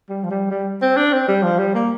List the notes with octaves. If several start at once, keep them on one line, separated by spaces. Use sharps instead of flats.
G3
F3
G3
G3
C4
D4
C4
G3
F3
G3
A#3